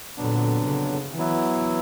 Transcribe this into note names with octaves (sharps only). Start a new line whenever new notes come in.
F2 A#2 D3 F#3 B3 D4
C#3
E3 F#3 B3 E4